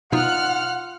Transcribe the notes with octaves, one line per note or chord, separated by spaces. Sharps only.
B2 D#4 F4 F#5 F6 F#6